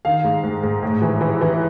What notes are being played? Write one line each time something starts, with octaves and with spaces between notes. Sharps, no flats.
D#3 F5
G#2
G#2
G#2
A2
E3
E3
E3